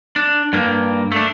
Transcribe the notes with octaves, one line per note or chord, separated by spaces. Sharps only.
D4
G2 A#3
A3 D4